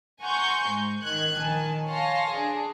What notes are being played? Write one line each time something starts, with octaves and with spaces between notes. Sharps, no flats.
F#5 G#5 A#5 C6 C#6 G6
G#2
D#3 F#6 G#6
A#1 D#3 G#5 A5
C#5 F5 G#5 A5 C6 A#6
D4 G#4